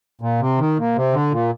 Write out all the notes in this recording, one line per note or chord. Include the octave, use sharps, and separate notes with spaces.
A#2
C3
D#3
A#2
C3
D3
A#2